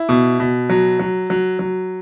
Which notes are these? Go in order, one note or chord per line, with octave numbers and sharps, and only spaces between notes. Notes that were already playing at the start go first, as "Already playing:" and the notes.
Already playing: E4
B2
B2
F#3
F#3
F#3
F#3